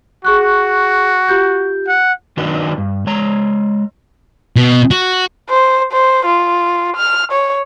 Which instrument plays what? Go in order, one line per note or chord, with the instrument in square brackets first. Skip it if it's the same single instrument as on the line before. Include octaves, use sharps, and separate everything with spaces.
[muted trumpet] F#4 [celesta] G#4 C#6 F#6
[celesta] F4 G4 G6
[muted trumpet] F#5
[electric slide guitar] D#3 F#3 D4 D#4 F#4 B4
G2
G#3 C#5 A#5
[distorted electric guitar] B2
F#4
[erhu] C5
C5
F4
F6
C#5